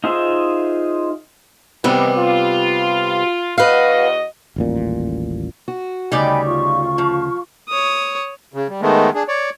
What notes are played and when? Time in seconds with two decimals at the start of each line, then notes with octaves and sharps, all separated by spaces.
0.04 D#4 F4 G#4 C5 E5
1.84 C3 D#3 E3 G3 B3
2.16 F4
3.58 E2 F#4 B4 D#5 F5
4.56 D#1 A1 A#2
5.68 F#4
6.12 D2 C#3 G3 D#4 D5 G5 G#5 B5
6.46 F4 C#6
6.98 F3
7.69 C#5 D#6
8.54 C#3
8.69 G3
8.82 D#3 G#3 A3 B3
9.14 D4 G#4
9.28 C#5 D5